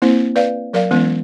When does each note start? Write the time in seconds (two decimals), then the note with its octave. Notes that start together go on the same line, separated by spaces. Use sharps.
0.02 A#3 C4 E4 C5
0.36 B4 D5 F5
0.73 F#3 A#4 D5 F5
0.91 E3 G#3 B3 C#4 E4